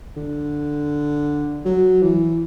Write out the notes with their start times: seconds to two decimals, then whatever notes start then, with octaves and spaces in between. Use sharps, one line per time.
0.17 D3
1.66 F#3
2.02 E3